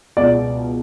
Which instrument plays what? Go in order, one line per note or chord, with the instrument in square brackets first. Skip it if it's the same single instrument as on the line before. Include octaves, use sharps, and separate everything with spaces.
[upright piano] C#2 B2 D5